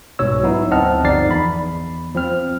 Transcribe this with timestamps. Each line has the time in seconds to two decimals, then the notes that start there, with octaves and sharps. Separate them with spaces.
0.19 C2 G#2 B2 C#5 E6
0.43 F#3 B3 D#4 E4
0.71 D2 C4 D#5 F#5 A5 F6
1.04 G1 F3 D#4 D5 A6 C7
1.29 E2 B5
2.15 F3 C4 F6